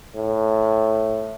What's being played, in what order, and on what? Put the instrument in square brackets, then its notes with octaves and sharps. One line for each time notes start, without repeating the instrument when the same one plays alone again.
[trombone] A2